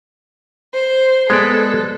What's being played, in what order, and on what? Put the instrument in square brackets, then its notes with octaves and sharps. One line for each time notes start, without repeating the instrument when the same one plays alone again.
[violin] C5
[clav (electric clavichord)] G#3 B3 D5 [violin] A4